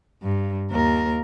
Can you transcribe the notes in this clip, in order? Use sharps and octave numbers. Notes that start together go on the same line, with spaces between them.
G2
D#2 A#4